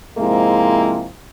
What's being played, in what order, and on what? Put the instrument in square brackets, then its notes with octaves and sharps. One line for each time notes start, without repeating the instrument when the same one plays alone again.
[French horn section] G#2 C3 F3 G#3 A#3 E4